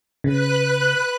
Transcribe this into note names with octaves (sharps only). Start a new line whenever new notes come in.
C#3 B4 F#6